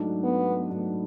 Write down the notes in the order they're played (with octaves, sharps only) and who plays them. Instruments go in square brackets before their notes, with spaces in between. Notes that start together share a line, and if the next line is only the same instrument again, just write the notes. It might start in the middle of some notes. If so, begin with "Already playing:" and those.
Already playing: [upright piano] G#2 F#3 A3 D4
[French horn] B3
[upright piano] G#2 F#3 A3 D4